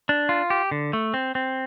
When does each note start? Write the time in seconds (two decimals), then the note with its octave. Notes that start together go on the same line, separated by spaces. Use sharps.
0.09 D4
0.29 F4
0.50 G4
0.71 D3
0.93 A3
1.14 C4
1.35 C4